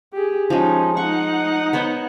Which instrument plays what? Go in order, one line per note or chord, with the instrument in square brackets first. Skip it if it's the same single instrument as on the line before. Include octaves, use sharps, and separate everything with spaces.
[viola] G4 G#4
[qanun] F3 G#3 [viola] C#4 D#4
[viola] D#4 F#5 [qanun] C#6
[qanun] B3 C5 C#5